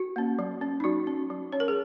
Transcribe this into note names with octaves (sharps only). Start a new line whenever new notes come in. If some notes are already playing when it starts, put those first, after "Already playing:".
Already playing: F#4
A#3 C#4
F#3
C#4
D#4
F#3 F#4
C#4
F#3
C#4 C#5
A#4
G#4